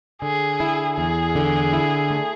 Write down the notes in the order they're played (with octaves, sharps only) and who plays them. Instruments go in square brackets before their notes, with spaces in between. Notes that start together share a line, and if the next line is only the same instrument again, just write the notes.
[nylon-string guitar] D3 [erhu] G#4
[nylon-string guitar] E4
[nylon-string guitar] E2 [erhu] G#4
[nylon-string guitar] D3
E4
A3